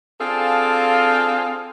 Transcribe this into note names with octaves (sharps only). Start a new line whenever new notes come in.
C4 D4 F4 G#4 A4 F5